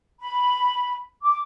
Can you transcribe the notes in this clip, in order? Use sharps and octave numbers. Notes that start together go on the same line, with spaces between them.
B5
D6